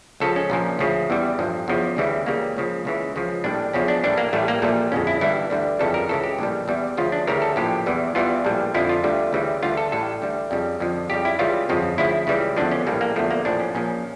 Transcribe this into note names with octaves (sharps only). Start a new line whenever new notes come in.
C#2 C#3 F3 A4
C#4
A#1 A#2 F3
D2 C#3 F3
E2 E3 G3
A1 G2 F3
E2 C#3 F3
D2 C#3 E3 G3
C#2 C#3 G3 A#3
C#2 C#3 F3
C#2 C#3 E3
C#2 C#3 F3
A#1 A2 G3 D4
E2 C#3 F3 C#4
D4
A#1 A2 E3 G3 D4
A#3
A1 A2 G3 A3
A#3
A#1 A#2 G3 A3
G1 F2 C#3 C#4
E4
G1 G2 E3 G3 E4
D2 D3 G3
G1 F2 C#3 E3 G3 A4
A#4
C#2 C#3 E3 A4
G4
A#1 A2 G3
E2 E3 G3
D2 C#3 F3 F4
D4
D2 C#3 E3 G3 A#4
A4
A#1 A2 F3 G4
E2 E3 G3
E2 E3 G3 F4
A#1 A2 G3
F2 D3 F3 E4
F4
D2 D3 G3
D2 C#3 E3 G3
D2 D3 G3 F4
A4
A1 A2 G3 A4
D2 D3 G3
F2 C#3 G3
F2 D3 F3
F2 C#3 G3 G4
E4
C#2 C#3 E3 G3 F4
G1 F2 C#3 F3
D2 C#3 F3 E4
C#2 C#3 E3 G3
E2 D3 F3 D4
C#4
A#1 A2 G3 A#3
A#3
E2 D3 F3 A3
A#3
A#1 A2 F3 D4
C#4
A#1 A#2 F3 C#4